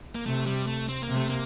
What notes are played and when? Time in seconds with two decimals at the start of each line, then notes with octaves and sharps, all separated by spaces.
0.15 A#3
0.26 C3 A3
0.46 G3
0.67 A3
0.89 C4
1.02 A#3
1.09 C3
1.17 A3
1.30 A#3